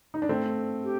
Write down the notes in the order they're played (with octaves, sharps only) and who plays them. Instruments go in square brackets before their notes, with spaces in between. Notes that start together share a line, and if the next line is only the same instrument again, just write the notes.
[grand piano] D#4
D4
A3 C4
[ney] G4